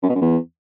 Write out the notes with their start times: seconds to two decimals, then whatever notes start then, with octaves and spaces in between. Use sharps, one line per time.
0.03 F#2
0.09 B2
0.15 F#2
0.21 E2